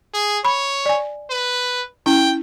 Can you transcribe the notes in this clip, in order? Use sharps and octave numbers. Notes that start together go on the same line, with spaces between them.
G#4
C#5 B5
D5 G#5
B4
C#4 E4 G5